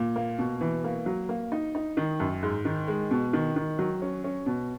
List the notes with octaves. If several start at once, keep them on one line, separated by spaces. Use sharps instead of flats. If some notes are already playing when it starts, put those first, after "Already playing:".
Already playing: A#2
A#3
B2
E3
A#3
F#3
A#3
D#4
D#4
D#3
F#2
G#2
D#3
G#3
B2
D#3
D#3
F#3
C#4
C#4
B2